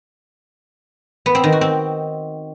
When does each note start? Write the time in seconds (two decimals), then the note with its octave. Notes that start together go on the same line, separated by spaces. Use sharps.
1.26 B3
1.35 C4
1.44 D#3
1.52 F#4
1.61 C4